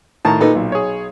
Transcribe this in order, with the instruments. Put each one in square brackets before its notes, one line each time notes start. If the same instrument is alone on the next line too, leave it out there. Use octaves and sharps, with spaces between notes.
[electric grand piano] A2 D#3 [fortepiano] A5 A#5
[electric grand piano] A#2 [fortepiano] D#4 A4 B4
[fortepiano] B1
[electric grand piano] G#4 C#5